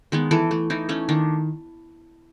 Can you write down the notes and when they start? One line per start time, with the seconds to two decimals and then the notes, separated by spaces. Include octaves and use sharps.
0.12 D#3 G#3 B3
0.31 E3 A4
0.51 A3
0.70 E3 D#4
0.89 A3 C#4
1.09 D#3 D4